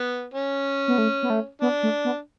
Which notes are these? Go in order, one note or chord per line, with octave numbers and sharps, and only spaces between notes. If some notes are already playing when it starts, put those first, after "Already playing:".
Already playing: B3
C#4
B3
A3
B3
A3
B3 D4
A3
B3